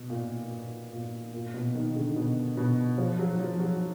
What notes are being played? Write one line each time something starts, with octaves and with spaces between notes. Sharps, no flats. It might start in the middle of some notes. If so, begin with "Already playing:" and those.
Already playing: B2
A#2
A#2
A#2
A#2
B2
D#3
D3
B2
B2
F3
F#3
F3
F#3